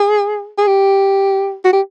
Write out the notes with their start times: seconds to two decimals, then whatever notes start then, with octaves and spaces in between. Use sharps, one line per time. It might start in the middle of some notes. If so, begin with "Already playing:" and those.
Already playing: G#4
0.58 G#4
0.67 G4
1.65 F#4
1.73 G4